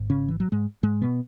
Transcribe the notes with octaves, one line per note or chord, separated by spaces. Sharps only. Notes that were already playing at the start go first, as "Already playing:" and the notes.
Already playing: G#1 G#2
C#3 C#4
E3
F#3
G#2 G#3
G#2 G#3
B2 B3